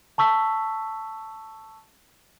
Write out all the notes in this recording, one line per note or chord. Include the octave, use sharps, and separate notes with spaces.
A5 C#6 E6 B6